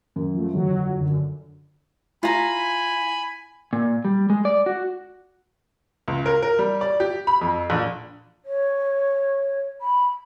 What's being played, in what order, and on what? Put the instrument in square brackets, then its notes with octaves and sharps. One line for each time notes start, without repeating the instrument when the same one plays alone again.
[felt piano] F#2
[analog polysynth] F3 A3
[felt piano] G1 F2 [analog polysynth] F#3
[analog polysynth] F#2 D3
[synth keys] E4 [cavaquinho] F4 A#5 [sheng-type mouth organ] G#5 B5
[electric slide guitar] A#2
G3
G#3
D5
F#4
[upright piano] C#2
A#4
A#4
G3
D5
G4
B5
F2
A#1
[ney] C#5
B5